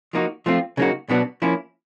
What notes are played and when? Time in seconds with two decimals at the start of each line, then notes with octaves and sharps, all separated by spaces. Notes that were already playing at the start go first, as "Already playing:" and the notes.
0.13 F3 A#3 D#4 F#4
0.46 F3 A3 C4 F4
0.77 C#3 F#3 A#3 D#4 F#4
1.09 B2 F#3 B3 D4 F#4
1.42 F3 A#3 C#4 E4